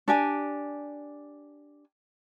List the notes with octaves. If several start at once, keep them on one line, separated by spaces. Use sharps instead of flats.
D4 G4 G#5